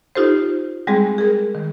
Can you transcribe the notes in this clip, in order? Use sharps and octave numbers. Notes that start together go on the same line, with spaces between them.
D#4 F4 G4 A4 C5
G3 G#3 C4 G#4
G#4 A#4
D#3